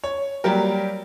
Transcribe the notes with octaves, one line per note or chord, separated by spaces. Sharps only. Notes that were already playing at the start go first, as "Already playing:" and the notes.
C#5
F#3 G3 A#3 G4 A#4